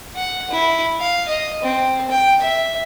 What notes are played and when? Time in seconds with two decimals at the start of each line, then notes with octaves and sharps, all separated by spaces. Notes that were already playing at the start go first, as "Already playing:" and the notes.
0.15 F#5
0.51 E4
0.99 F5
1.28 D#5
1.62 C4
2.10 G5
2.41 E5